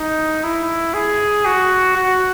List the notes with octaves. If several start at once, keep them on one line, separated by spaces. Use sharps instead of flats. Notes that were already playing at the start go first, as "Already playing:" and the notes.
Already playing: D#4
E4
G#4
F#4
F#4